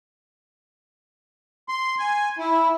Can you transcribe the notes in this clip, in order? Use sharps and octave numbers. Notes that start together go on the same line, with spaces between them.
C6
G#5
E4